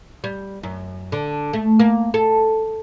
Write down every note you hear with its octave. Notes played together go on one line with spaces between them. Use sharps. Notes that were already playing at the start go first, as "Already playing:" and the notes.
G3
F#2
D3
A3
A#3
A4